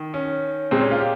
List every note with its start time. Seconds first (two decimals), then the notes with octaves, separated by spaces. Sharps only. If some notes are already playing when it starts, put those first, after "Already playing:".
Already playing: D#3
0.14 C#4
0.71 A#2 G#3 C4
0.81 C#4
0.91 F4
1.00 G4